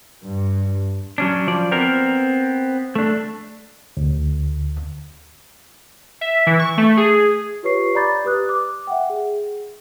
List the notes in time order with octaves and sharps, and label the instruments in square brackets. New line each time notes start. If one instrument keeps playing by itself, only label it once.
[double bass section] G2
[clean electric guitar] F#3 C#4 D4
F3 D5
B3 C4 A#4
A3 D4
[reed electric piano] D2
[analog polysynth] E5
E3
C#6
A3
G#4
[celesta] F4 G4 B4 C#5 C#6 C7
D5 A#5 B5 D6 G6 A6
G4 B4 D#6 F#6
D6
E5 F#5 G5
G#4